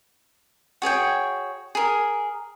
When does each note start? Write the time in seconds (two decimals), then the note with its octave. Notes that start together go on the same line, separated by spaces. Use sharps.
0.82 F#4 G#4 C#5 G5
1.75 G#4 A#4